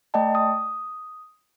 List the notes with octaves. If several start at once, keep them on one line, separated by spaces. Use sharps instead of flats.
A3 D5 D#5 G5 A5
D#6